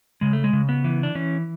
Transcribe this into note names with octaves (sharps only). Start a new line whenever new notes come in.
C#3 G#3
A3
G#3
C#3
B3
E3
D4
E3 C#4